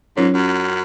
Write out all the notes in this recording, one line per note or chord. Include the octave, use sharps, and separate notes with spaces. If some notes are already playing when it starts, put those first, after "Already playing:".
G#2 F#3 C#4 F4 A#4 C#5
F#2